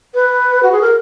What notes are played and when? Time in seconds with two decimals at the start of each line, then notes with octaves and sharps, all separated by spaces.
0.14 B4
0.63 F#4
0.72 G#4
0.82 A#4